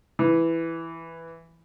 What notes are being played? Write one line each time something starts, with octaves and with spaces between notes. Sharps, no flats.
E3